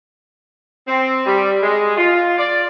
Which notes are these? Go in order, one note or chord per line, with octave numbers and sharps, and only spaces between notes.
C4
G3
G#3
F4
D5